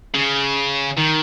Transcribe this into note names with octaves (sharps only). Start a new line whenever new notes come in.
C#3
D#3